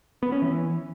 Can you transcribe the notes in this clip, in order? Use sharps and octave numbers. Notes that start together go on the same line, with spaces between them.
B3
C#4
E3